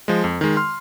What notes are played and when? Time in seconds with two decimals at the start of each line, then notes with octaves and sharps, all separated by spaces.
0.08 F3 G#3
0.24 F2
0.41 D#3 G#3
0.57 C6 F6